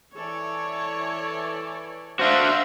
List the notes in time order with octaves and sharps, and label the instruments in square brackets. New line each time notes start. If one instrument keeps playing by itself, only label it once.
[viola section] E3 A4 D5 [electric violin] C#5
[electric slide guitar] D4 F#4 [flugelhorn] C5 [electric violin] E5 F5